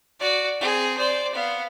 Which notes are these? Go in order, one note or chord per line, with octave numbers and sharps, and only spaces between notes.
F#4 D5
C4 G#4
C5 D5
B3 F5